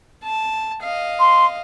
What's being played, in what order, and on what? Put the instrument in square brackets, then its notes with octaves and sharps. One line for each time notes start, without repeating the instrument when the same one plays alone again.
[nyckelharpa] A5
D#5 F5
[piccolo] C6